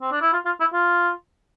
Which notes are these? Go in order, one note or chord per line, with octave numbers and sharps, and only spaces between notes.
C4
D4
E4
F4
F4
E4
F4